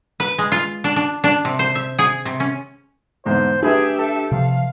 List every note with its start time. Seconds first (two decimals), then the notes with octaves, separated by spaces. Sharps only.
0.20 B4
0.38 G#3
0.52 F4
0.84 D4
0.96 D4
1.24 D4
1.45 C3
1.59 C5
1.75 E5
1.99 G#4
2.25 C3
2.40 C#4
3.26 E2 G#2 D3 C5
3.62 A3 D4 E4 G4 G#4 B4 E5
3.99 A4
4.32 C3 F3 F5